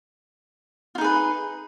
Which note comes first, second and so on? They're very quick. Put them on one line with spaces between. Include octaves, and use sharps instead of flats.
F4 D#4 G#4 B4